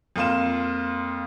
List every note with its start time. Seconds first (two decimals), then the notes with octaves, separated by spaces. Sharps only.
0.16 F2 A#3 F4 C6 E7